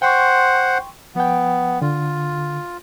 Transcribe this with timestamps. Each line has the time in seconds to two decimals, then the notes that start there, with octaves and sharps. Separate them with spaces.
0.02 C5 F#5 G5 C6 C#6
1.15 F3 B3 G5
1.82 D3 F4